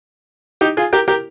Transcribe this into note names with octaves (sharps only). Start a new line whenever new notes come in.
D#4 G4
F4 G#4
G4 A#4
G4 A#4